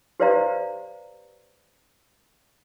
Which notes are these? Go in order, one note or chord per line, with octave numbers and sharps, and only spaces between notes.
G4 B4 C5 D5 F5 A#5